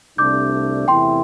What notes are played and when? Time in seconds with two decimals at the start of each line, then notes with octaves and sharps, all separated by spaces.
0.18 C2 C3 A3 D4 D6 G6
0.88 E2 C3 E3 A3 E4 G5 C6